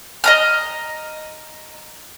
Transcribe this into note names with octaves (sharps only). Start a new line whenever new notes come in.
D#5 A#5 F6